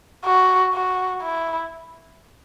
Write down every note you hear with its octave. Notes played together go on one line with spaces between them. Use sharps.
F#4
F#4
E4